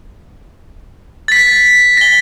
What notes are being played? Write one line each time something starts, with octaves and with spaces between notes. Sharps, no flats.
A6 B6
A#6 G7